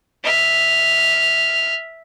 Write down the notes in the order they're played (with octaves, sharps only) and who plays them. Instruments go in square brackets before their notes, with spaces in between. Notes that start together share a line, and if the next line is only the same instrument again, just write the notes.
[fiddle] E5 F6